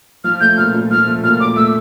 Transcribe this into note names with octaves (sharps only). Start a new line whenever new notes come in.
F3 F6
A3 G6
A#2 F6
A#2
F3 F6
A3
A#2 F6
A#2 D6
A3 E6